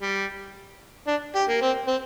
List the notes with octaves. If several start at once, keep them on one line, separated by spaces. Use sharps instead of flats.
G3
D4
G4
A#3
C4
C4